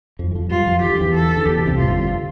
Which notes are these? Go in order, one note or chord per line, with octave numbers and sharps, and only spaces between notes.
F2 F3
E3
F2 F3
G2 G3 F4
F2 F3
E3 G4
D3
E2 E3
A4
D3
E2 E3 G4
B2
C2 C3
A2 F4
G1 G2